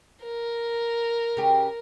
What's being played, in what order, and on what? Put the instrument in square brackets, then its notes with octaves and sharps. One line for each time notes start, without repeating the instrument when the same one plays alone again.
[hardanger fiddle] A#4
[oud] C#3 G4